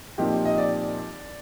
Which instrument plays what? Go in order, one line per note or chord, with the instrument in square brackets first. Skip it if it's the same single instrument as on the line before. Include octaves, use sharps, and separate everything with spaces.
[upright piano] A#2 F3 C4 D#4 G4
[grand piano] D#5
D5